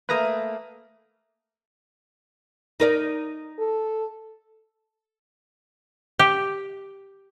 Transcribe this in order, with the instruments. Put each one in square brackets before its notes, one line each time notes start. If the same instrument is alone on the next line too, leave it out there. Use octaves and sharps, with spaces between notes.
[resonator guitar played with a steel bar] A3 A#3 [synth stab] B4 A#5 D#6
[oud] D#4 A#4 D5
[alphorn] A4
[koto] G4